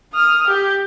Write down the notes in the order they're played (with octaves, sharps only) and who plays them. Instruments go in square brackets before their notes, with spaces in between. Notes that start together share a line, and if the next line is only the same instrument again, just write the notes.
[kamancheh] D#6 F6
G4